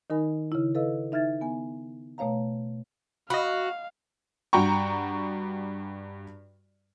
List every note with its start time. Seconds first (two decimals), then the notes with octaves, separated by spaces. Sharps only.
0.10 D#3 D#4 A#4 G#5 B5
0.52 C#3 E4
0.75 A4 B4 D#5 F5 E6
1.12 D#4 E5 F6 G#6 A6
1.41 B3 G#5
2.18 B2 A3 C#5 F5 A#5
3.30 F#4 D#5 F5 B5
4.53 G2 F#4 G5 A#5 C#6